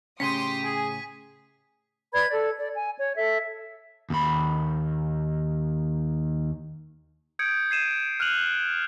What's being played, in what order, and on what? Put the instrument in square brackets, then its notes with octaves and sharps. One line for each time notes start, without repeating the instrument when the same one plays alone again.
[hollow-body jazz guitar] A2 C#3 C#4 [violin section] G4 C6 D#6 [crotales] B6 D#7
[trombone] G#4 [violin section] G#5
[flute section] B4 D5 B5 G#6
A4 D5
D5
G#5
C#5
A4 E5
[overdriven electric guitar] D#2 B5
[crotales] D#6 G6 G#6 C#7 D7
G#6 C7 D#7 E7
F6 F#6 D#7 F7 F#7